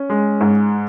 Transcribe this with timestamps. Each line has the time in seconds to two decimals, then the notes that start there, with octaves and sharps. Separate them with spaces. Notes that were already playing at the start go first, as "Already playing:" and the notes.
Already playing: C#4
0.10 G#3
0.41 G#2